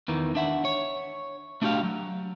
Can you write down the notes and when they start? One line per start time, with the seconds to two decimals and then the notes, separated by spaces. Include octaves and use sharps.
0.08 E2 D#3 E3
0.35 D4 E5 F#5
0.65 C#5
1.62 A3 D4 F#4 G4 F5
1.83 F#3